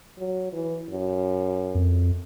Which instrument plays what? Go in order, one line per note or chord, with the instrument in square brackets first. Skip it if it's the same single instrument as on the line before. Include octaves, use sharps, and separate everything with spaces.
[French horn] F#3
E3
F#2
[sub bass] F2